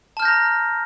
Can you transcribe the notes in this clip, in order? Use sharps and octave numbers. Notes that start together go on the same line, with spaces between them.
A5 A#5 F6 G6 A#6